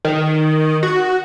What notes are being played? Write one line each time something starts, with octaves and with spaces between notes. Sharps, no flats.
D#3
F#4